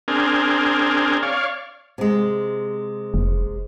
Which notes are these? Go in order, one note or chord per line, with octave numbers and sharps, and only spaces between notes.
C4 D4 G#4 A#4
C#5 D5 F5
C3 G#3
F1